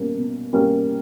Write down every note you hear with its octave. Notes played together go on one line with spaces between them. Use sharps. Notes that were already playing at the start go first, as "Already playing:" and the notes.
Already playing: B2 G3 A#3 C#4
B2
G3 A#3 C#4